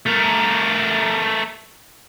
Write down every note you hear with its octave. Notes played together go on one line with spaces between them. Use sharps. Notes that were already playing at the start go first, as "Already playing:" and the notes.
A3 A#4